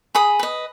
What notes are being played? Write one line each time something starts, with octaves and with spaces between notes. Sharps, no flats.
G#4 B5 D#6
B4 D#5